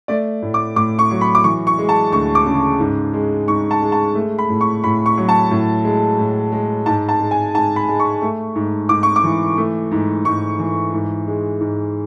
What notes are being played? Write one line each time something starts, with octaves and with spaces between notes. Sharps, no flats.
A3 D5
A2
D6
A2 D6
C#6
F#3
B5
D6
E3 C#6
C#6
G#3
A5
D2 C#6
D6
C#3
G#2
G#3
G#2 C#6
A5
G#3
A5
A3
B5
A2
C#6
A2 B5
C#6
F#3
A5
A2
G#3
A2
G#3
G#2 A5
A5
G#3
G#5
G#2 A5
B5
G#3
C#6
A3
G#2
G#2 D6
C#6
D6
E3
A3
G#2
G#2 C#6
E3
G#2
G#3
G#2